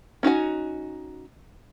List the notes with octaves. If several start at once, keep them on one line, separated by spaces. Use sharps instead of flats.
C#4 D#4 F#4 G#5